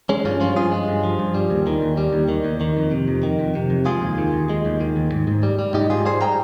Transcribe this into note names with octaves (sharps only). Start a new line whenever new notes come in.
G#3 C#4
G2 C#4 F4
F3 C#4 F4
G2 F4 G#4
G#3
G2
F3
G2
G3
D#2
D#3
D#2
G3
D#2
D#3
D#2
D#3
F2
C3
F2
D#3
F2
C3
F2
G#3 F4 G#4
D#2
D#3
D#2
G#3
D#2
D#3
D#2
G#2
G#2
G3
G3
G#2 D#4 G4
G#2 F4 G#4
G3 G#4 C5
G3 G5 A#5